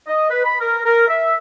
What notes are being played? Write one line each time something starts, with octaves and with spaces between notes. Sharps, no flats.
D#5
B4
B5
A#4
A#4
E5